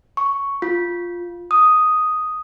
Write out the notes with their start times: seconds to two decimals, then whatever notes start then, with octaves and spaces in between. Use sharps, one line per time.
0.17 C#6
0.62 F4
1.51 D#6